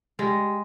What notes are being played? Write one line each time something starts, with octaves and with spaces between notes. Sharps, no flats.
G3 G#3